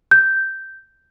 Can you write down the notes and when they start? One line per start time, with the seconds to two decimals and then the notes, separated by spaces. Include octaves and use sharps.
0.11 G6